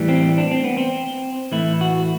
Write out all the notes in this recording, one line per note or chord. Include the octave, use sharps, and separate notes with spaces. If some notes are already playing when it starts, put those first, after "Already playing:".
Already playing: A2 E3 G3
C4
D4
C4
B3
C4
A2 E3 A3 E4
F#4